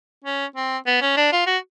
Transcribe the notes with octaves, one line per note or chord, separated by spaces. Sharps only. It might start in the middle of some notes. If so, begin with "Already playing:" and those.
C#4
C4
B3
C#4
D4
F4
F#4